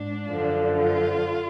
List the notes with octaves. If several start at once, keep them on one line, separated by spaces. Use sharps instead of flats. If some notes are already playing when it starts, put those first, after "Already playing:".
Already playing: G#2 D4
F#2 D3 F3
F4